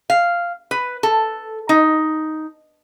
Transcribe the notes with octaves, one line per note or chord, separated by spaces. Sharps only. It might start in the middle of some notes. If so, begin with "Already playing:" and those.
F5
B4
A4
D#4